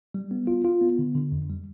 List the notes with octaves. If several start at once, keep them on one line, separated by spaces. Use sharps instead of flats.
G3
B3
F4
F4
B3
D3
D3
F2
G3